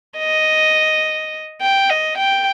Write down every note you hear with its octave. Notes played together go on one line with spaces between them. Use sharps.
D#5
G5
D#5
G5